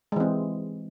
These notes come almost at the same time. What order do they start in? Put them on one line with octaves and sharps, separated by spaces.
G#3 E3 C4